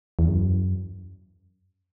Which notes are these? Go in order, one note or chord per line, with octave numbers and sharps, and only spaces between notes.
E2
F#2